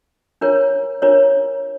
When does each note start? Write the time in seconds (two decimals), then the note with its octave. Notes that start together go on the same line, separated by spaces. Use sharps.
0.41 D4 F4 A#4 C#5
1.02 D4 F4 A#4 C#5